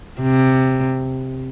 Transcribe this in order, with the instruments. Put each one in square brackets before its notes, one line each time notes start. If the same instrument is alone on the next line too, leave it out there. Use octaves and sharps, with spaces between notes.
[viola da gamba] C3